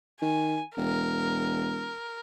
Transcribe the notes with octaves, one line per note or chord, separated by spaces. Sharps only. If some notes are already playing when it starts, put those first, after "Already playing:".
D#3 G#5
E1 A#4